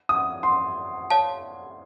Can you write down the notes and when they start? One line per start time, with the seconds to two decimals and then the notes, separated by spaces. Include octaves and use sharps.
0.09 D#6
0.43 C6
1.10 C#5 F5 A5